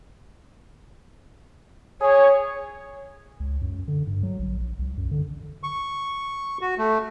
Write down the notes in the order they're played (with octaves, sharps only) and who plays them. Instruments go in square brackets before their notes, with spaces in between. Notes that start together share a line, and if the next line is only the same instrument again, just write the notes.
[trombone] G#4 [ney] C#5
[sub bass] C#2
F#2
D3
G2
F#3
A#1
A#1
C2
F#2
D3
[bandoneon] C#6
F#4
A3